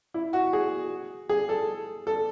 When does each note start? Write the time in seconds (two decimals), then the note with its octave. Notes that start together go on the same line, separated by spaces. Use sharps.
0.14 E4
0.33 F#4
0.53 G#4
1.29 G#4
1.49 A4
2.07 A4